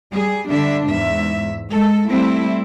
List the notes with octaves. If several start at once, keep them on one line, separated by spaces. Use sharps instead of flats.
G3 G#4
D3 G3 D4 E5
E2 G#2 E5
G#3 A4
G3 A3 C4 E4